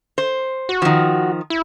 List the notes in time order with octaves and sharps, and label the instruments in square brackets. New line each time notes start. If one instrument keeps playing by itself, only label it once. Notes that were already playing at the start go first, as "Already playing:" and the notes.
[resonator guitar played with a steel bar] C5
[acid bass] F#4
[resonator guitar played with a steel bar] D#3 F3
[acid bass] E4